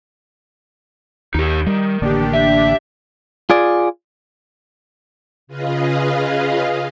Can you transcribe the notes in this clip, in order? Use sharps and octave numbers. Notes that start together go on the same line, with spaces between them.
D#2 D#4 G4
D#3 G3
A1 D3 A#3 D4 G4
E5
F4 G#4 D5
C#3 F4 G#4 B4 D#5 F5